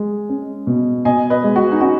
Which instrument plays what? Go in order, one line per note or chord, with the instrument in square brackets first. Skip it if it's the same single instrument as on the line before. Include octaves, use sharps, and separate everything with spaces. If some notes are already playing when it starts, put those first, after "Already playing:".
Already playing: [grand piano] G#3
C#4
B2
[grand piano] B2 [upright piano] D#5 G#5
[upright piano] B4 D#5
[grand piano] G#3
[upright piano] F#4
D#4
[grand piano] C#4 [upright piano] F#4